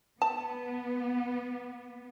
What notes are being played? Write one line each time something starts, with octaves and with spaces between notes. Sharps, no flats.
B3 A5